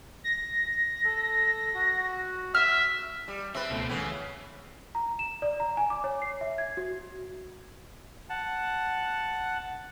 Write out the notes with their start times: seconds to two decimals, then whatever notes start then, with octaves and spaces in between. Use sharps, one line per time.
0.24 A#6
1.04 A4
1.75 F#4
2.55 E5 E6 F6
3.28 G3
3.55 C4 B4 E5
3.70 C#2 B2 A3
3.90 C2 C#3 E3 B3
4.95 A#5
5.19 E7
5.42 D5
5.60 A#5
5.77 G#5
5.90 D6
6.04 C#5
6.22 C7
6.41 E5
6.58 G#6
6.77 F#4
8.30 F#5 A5